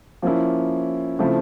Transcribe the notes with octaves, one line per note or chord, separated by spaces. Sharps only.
F3 A#3 C#4 E4
C#3 F3 A3 C4 E4